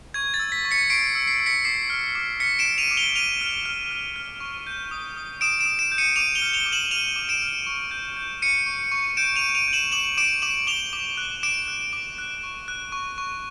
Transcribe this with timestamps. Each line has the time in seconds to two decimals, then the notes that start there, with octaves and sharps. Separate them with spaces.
0.14 C#6 G#6
0.34 A6
0.39 E6
0.52 B6
0.65 C#6
0.71 B6 C#7
0.90 C#6 C7 D7
1.15 E6
1.28 C7
1.40 E6
1.46 B6 C#7
1.65 D6 C7
1.90 F6
2.15 D6
2.40 F6 B6 C#7
2.59 D7 E7
2.66 F6
2.78 D#7 F7
2.91 D6
2.97 F7 G7
3.15 F6 D#7 F7
3.41 F6
3.65 F6
3.91 F6
4.16 F6
4.40 C#6
4.67 G6
4.91 D#6
5.17 D#6
5.41 D#6 D7 E7
5.60 D7 E7
5.66 D#6
5.79 D7 E7
5.92 G6
5.98 C#7 D#7
6.16 D6 D#7 F7
6.35 F7 G7
6.42 F6
6.53 F7 G7
6.66 D6
6.72 E7 F#7
6.91 F6 D#7 F7
7.16 D6
7.29 D7 E7
7.42 F6
7.66 C#6
7.91 G6
8.17 G6
8.42 C#6 C#7 D#7
8.66 C#6
8.92 C#6
9.17 G6 D7 E7
9.36 D#7 F7
9.42 G6
9.55 D#7 F7
9.68 G6
9.73 E7 F#7
9.92 D6 E7 F#7
10.18 D6 D7 E7
10.42 D6 E7 F#7
10.67 D6 F7 G7
10.93 D6
11.17 F#6
11.43 D6 D7 E7
11.68 F#6
11.93 D6
12.18 F#6
12.43 C#6
12.68 F#6
12.92 C#6
13.18 C#6